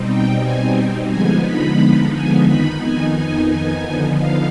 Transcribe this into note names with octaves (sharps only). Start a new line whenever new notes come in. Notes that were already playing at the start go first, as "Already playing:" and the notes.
Already playing: B2 G3 C4 D#4
G5
G#5
D3 F3 G#3 B3 D#4 G#5
B5
G#5
F2 D#3 B3 D#4 B5
G#5
G#5
G#5
D3 F3 B3 D#4
F5